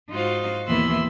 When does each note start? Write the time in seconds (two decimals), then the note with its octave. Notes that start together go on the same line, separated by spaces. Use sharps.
0.10 G#2 D#4 F4 F#4 C5 F5
0.67 D#2 B2 E3 B5 C6 E6